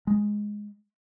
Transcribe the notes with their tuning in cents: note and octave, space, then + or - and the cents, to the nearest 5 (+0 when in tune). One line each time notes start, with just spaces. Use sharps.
G#3 +0